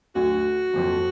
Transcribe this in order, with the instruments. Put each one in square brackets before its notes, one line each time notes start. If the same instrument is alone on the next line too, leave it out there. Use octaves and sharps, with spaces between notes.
[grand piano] D2 D3 F#3 [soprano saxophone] F#4
[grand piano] F#1 F2 F3